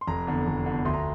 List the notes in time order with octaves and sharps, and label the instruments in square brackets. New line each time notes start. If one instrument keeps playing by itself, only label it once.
[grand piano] C6
F1 A#5
E2 D3
F1
E2 D3
D2 C6
A#5